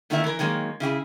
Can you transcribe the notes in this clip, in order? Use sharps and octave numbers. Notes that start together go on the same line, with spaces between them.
A#2 D#3 A3 E4 A#4 E5
E3 A#4
D#3 F#3 G#3 A#3
C#3 E4 G4 G#4